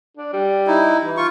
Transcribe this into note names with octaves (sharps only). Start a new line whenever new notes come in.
D4
G3
D#4 E4
E3
F4 C#6